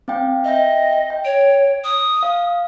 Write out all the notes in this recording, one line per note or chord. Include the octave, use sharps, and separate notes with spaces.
C4 F5 G5
D#5 E5 G5
G5
C#5 D7
D#6
F5